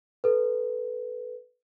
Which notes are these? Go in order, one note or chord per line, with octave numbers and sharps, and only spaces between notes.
A4 B4